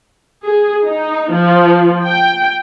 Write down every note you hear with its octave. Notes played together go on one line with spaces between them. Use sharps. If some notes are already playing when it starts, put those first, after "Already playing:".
G#4
D#4
F3
G5